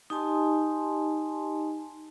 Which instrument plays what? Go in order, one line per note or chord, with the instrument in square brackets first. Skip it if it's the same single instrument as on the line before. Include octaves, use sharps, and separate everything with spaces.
[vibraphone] D#4 G4 D#5 G#5 A5 C6